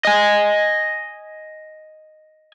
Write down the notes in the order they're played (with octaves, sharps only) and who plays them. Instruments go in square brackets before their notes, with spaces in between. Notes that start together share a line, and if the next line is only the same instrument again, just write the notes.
[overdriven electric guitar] D#5 G#5